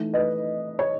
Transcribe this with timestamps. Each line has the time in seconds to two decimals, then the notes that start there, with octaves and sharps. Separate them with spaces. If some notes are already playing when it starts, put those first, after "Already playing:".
Already playing: E3 A3 D#4
0.13 B4 D#5
0.79 C#5